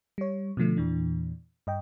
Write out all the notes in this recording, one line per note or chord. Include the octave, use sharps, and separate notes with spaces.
G3 C#5
B2 D3 F3 A3
E2 A#2 E3 D4
G2 D#5 G5